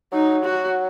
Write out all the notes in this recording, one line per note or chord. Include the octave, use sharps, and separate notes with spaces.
F#3 D#4
F#4